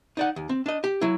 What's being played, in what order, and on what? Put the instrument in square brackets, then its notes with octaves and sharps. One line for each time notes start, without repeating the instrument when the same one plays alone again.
[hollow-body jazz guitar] D#4 D5 F#5
D#2
C4
D4 D#5
G4
F#3 E4